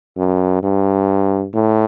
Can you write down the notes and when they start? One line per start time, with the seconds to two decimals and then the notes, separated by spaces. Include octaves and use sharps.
0.17 F#2
0.62 G2
1.54 A2